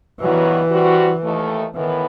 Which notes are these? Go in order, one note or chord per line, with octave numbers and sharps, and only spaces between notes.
G2 D#3 E3 F#3 B3 F#4
G3 C4 F#4
D#2 D#3 A3
A2 D#3 E3 B3